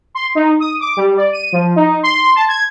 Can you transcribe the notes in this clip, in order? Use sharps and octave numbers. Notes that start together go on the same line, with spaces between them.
C6
D#4
D#6
D6
G3
D5
D#7
F3
D#4
C6
A5
G#6